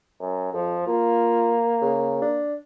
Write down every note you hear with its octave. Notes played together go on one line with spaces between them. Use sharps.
F#2
F2 F3
A#3 F4
C#3
D4